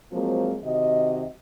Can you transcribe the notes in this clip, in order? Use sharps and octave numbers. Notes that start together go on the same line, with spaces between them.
F3 F#3 G#3 A#3 C4
C3 D#3 F#4 D#5